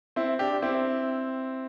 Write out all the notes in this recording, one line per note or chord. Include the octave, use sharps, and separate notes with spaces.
C4 E4
D4 G4
C4 E4